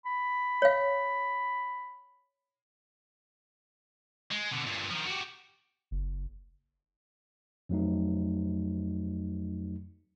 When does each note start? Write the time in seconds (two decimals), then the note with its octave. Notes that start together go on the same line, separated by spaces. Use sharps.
0.05 B5
0.62 C#5 F5
4.31 G#3
4.52 B2 D3
4.67 G2 A#2
4.91 D#3 F3
5.06 F#4 G4
5.91 F#1
7.69 F2 F#3 A3 D#4